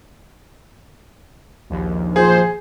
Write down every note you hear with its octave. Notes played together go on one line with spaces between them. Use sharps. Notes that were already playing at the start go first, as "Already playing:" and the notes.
A#1 D#2
F3 G#4 C5